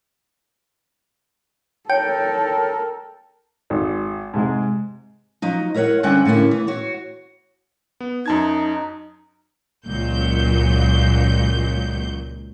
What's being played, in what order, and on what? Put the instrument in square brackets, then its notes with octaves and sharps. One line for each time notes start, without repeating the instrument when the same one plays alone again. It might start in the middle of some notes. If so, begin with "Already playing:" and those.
[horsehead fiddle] A4 A#4 [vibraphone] C#5 [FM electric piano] G5
[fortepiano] G#1
G#2 C3 G#3
[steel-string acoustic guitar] F3 F#3 D#4
E4 A#4 C#5 D#5 F#5
G2 D3 C4 C#4 F#5 G5
A2 D3 A#3 C#4 E4
E3
F#4 C#5
[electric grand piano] B3
[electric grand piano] F#2 A5 G#6 [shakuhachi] D#4
[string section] C#2 A#2 F#3 G6